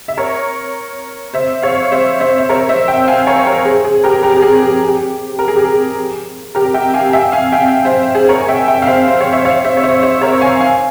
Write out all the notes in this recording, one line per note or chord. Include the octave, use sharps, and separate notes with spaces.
E5
A#4 C#5
C5 E5
C#5 F5
C5 E5
C5 E5
E5
A#4 C#5
C5 E5
E5 G5
F5 G#5
A#4 C#5
A#4 C#5
G#4 C5
G#4
G4 A#4
G4 A#4
G4
G#4
G4
G4
A#4
G#4
G4
G#4
G4 A#4
E5 G5
F5 G#5
E5 G5
F5 G#5
E5 G5
C5 E5
G#4 C5
A#4 C#5
G#5
E5 G5
E5 G5
F5
C5 E5
C5
C#5
E5
C#5 F5
C5 E5
C#5
C5 E5
C5 E5
A#4 C#5
F5 G#5
F5 G#5